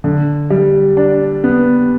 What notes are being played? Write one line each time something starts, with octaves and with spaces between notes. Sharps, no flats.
D3
G3
D4
B3